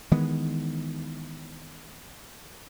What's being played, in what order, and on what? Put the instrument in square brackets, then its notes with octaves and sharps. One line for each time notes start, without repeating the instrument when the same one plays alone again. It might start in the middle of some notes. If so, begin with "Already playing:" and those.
[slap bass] D#3 E3 G#3 B3